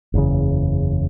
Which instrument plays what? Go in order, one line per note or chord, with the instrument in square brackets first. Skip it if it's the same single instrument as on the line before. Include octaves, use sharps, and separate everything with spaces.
[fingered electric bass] F#1 E2 C#3